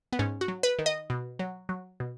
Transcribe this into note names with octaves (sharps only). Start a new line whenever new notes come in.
B3
G#2 C#4
F#4
F#3
B4
D#3
D#5
B2
F#3
F#3
B2